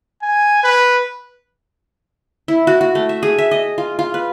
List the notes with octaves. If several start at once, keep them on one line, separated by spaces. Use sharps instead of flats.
G#5
B4
E4
F#4
F#4
A3
E5
G#4
E5
D#5
F4
F4
B4